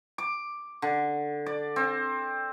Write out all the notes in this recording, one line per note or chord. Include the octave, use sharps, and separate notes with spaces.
D6
D3
D5
C4